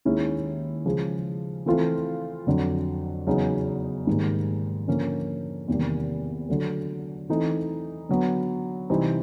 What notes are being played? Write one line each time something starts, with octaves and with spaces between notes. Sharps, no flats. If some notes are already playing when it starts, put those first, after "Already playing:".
D#2 D#3 G#3 C#4 E4
C#3 F3 G#3
E3 A3 C4 F4
F2 D3 F#3
E2 C#3 F#3 B3 D#4
G#2 D#3 G3 A#3
D3 F3 A#3 C#4
E2 C3 D#3 G3 A#3
D3 F#3 A3
E3 A3 C4 D#4
D3 F#3 B3
C3 E3 G3 C4 D#4